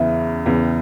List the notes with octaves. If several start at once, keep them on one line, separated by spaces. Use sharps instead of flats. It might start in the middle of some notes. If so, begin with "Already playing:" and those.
Already playing: E2 C#3 E3 E5
E2 C#3 E3